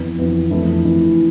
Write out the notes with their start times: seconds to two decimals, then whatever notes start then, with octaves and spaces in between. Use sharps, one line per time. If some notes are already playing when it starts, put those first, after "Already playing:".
Already playing: F2 E3 B3
0.18 F2 E3 B3
0.51 F2 E3 A3 E4
0.84 F2 E3 A3 E4